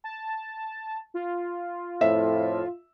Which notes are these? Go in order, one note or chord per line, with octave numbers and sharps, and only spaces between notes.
A5
F4
F2 A2 E5